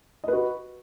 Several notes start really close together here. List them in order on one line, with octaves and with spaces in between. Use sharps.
D#5 B4 F#4